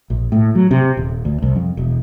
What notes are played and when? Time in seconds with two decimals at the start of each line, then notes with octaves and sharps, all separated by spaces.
0.10 A#1
0.32 A2
0.55 F#3
0.71 C3
0.97 D#1
1.25 D2
1.42 C2
1.56 F2
1.77 E1